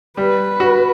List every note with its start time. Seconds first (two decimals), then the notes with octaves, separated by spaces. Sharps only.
0.17 G3 B4
0.60 F#4